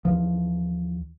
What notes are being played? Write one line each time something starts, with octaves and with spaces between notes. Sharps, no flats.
D#2 E3 F3